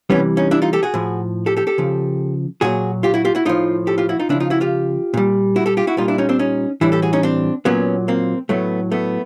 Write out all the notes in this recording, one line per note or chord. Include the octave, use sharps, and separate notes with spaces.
C3 E3 G3 B3 C#4
C#4 D#4
D4 E4
D#4 F4
G4 A4
F#4 G#4
A2 F3
G4 A4
G4 A4
G4 A4
C#3 F3
A#2 F#3 F#4 G#4
F4 G4
E4 F#4
F4 G4
E4 F#4
A2 F3 D#4 F4
G4 A4
F4 G4
E4 F#4
D#4 F4
C#3 F3 D4 E4
D#4 F4
E4 F#4
F4 G4
A#2 G3
E4 F#4
G4 A4
F4 G4
E4 F#4
A#2 G3 D#4 F4
D4 E4
C#4 D#4
C4 D4
C#4 D#4
A2 E3 G3 D4 E4
G4 A4
F#4 G#4
C#4 D#4
C4 D4
A#2 F#3 B3 C#4
A#3 C4
A2 F#3 A3 B3
A3 B3